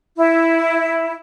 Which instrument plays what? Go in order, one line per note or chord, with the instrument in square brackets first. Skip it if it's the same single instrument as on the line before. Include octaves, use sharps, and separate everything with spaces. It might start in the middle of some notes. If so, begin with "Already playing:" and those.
[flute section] E4